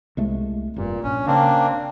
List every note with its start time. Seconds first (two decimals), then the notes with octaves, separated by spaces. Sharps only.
0.17 C2 G#3 A3
0.76 F1 G2 A#2
1.04 A#1 C#4
1.27 C#3 A#3 C4 D4